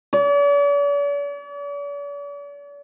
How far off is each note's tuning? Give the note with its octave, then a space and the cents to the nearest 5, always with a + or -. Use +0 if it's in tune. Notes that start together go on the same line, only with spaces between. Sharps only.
D5 -45